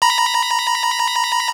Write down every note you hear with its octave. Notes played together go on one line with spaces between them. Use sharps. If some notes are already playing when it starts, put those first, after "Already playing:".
A#5 B5 A#6